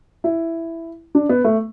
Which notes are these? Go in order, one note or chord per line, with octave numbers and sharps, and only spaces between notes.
E4
D4
B3
A3